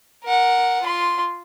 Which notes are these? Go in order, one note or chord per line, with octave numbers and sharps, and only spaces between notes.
A#4 F#5
F4 C6